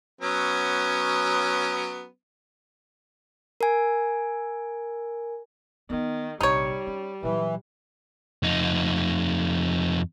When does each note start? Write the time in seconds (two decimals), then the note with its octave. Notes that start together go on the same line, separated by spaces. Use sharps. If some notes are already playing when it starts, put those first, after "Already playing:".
0.21 F#3 B3 C#4
3.61 A#4 G#5
5.90 D#3 B3 D#4
6.41 A#1 C3 G3 D#4 C#5
6.87 C#4
7.23 A#2 E3 F#3
8.43 F2 D#4